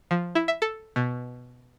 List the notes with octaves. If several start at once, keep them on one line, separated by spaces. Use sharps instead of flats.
F3
E4
E5
A4
B2